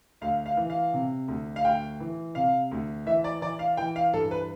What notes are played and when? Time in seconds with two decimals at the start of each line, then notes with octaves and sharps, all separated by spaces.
0.21 D2 F5
0.46 F5
0.57 E3
0.70 F5
0.93 C3
1.28 D2
1.56 F5
1.65 D2 G5
2.00 E3
2.35 C3 F5
2.71 D2
3.06 E3 E5
3.24 D5
3.41 E3 D5
3.59 F5
3.77 E3 G5
3.96 F5
4.13 G2 A4
4.31 B4